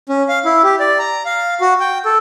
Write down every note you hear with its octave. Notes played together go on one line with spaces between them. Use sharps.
C#4
F5
E4
G4
D5
A#5
F5
F#4
G5
A4